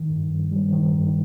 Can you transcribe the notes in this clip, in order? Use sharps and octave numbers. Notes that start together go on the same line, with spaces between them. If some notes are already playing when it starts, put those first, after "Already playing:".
Already playing: D#3
G2
G2
G3
D#3
G2